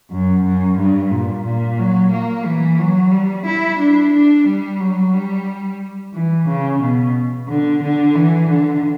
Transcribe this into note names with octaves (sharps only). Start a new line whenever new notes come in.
F#2
F#2
G2
A#2
A#2
F#3
A#3
E3
F#3
G3
E4
D4
D4
G3
F#3
G3
E3
C#3
B2
D3
D3
E3
D3